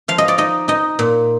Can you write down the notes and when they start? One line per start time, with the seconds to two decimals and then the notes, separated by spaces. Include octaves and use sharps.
0.08 F3 F5
0.18 D#5
0.28 D5
0.38 D#4 D#5
0.68 D#4 D#5
0.99 A#2